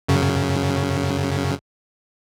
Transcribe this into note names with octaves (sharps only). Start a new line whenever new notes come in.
F#2 C#3